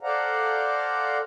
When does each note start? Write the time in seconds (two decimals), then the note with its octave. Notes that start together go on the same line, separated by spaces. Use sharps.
0.01 A4 C5 D5 F5 F#5 A#5